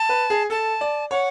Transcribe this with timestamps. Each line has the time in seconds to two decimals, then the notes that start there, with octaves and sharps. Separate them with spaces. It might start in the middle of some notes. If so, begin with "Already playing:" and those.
Already playing: A5
0.09 B4
0.30 G#4
0.50 A4 A5
0.81 D5
1.11 C#5 F#5